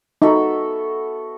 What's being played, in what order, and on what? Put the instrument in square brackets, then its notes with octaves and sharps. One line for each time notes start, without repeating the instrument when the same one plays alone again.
[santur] B3 F#4 A4 E5 [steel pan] D#4